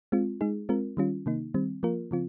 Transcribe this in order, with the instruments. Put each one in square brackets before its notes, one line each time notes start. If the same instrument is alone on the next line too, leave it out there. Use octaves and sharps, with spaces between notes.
[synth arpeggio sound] G#3 C4 F4
G#3 D#4 G#4
G#3 C4 F4 A#4
D#3 G3 C#4 F4
C3 D#3 A#3 D#4
D#3 G3 C4
F3 A#3 F4 A#4
C#3 F3 C4 F4